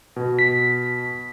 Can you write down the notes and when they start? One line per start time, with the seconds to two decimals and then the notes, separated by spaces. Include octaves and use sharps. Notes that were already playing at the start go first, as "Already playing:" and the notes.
0.16 B2
0.39 B6